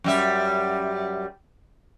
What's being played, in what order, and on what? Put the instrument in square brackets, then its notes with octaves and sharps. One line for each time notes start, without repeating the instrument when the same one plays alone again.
[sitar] F#2 G3 E5